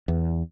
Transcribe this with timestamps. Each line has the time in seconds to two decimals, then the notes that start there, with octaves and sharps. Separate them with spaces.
0.08 E2